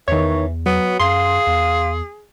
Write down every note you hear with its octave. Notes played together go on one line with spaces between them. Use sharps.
E2 D#3 E3 C#5
F#3 B3
F#2 G#4 F5 C6
E2